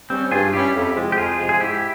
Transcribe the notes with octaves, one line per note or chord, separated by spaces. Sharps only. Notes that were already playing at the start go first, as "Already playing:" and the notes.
G3 C4 C#4
G2 F4 G#4
G3 C#4 E4 G4
F2
C3 F3 G#3
G4
F2 F4 G#4
C3 F3 G#3
G#4
G#2 E4 G4